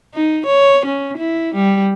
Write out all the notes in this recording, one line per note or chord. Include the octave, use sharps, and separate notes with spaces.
D#4
C#5
C#4
E4
G3